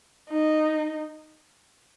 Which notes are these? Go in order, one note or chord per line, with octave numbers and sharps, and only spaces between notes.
D#4